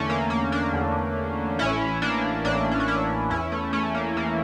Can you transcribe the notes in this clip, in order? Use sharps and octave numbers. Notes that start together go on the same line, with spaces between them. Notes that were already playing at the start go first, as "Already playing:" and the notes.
Already playing: E2 D3 A3 C#4
A#3
A#3
A#3 D4
E2 D3
A1 A2 E3 C#4 E4
A#3 D4
A1 A2 E3 A#3 D4
C#4
D4
C#4 E4
E2 E3 C#4 E4
A3 C#4
A3 C#4
A#3
E2 E3 A#3